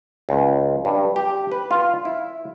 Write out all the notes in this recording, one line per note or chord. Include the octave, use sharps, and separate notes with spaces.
C#2
G2
G4
B4
F4
E4